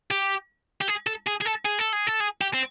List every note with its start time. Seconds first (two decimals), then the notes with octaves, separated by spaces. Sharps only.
0.11 G4
0.81 G4
0.88 G#4
1.07 A4
1.27 G#4
1.41 G#4
1.45 A4
1.65 G#4
1.79 A4
1.93 G#4
2.07 A4
2.20 G#4
2.41 G4
2.54 C4